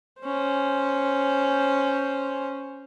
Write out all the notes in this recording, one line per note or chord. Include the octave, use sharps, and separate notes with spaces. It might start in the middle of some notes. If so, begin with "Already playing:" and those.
C#4 C5